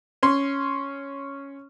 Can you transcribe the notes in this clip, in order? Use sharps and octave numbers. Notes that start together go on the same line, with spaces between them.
C#4 C6